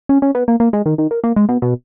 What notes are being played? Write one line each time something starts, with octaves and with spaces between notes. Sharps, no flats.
C#4
C#4
B3
A#3
A#3
G#3
D#3
D#3
A#3
A#3
G#3
B2
B2